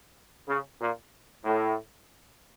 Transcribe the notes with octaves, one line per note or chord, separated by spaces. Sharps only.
C#3
A#2
A2